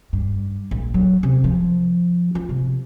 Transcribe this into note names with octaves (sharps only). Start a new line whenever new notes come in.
G2
A#1
F#3
C3
F3
F4
C3